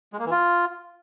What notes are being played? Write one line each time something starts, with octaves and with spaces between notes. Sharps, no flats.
G#3
A#3
E3
F4